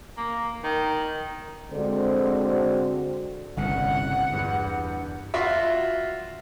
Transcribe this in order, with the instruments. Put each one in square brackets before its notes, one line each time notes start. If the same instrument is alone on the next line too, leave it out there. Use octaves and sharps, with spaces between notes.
[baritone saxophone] A#3
D#3
[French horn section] D3 G#3 C4 F#4 C5
[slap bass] G1 C2 C#3 [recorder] F#5
[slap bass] E2 G2
[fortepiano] F4 F#4 E5